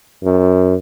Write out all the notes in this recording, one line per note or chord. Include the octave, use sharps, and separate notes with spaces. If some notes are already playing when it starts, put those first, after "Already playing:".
F#2